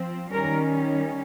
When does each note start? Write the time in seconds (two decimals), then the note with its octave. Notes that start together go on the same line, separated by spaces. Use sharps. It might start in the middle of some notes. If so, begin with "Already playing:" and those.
Already playing: F3 C4
0.33 D#3 G3 C#4 A#4